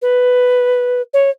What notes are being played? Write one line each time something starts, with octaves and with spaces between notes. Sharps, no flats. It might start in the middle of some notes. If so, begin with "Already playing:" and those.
B4
C#5